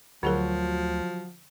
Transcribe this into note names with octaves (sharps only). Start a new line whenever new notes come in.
D2 D3 F3 F#3 F#4 G#4 A#4